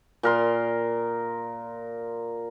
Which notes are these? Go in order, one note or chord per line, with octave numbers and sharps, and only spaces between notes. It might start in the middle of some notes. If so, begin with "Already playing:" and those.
A#2 A#4 C6